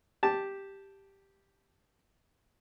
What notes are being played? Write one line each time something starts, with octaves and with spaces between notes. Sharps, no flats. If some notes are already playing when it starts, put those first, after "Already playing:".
G4 A5